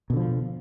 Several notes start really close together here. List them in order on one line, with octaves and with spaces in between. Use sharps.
B2 D3 F3